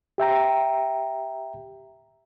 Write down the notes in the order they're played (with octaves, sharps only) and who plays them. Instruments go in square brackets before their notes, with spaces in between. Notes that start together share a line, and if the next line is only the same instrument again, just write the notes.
[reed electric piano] G4 E5 G5 A#5